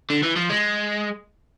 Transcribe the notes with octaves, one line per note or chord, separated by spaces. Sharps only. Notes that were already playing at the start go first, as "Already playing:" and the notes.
D3
E3
F3
G#3